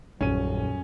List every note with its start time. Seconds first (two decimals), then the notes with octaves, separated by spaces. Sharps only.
0.21 D#1 A#1 F#2 C#4 D#7